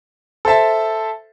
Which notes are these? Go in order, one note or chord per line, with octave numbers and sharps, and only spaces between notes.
A4 C5 E5 A5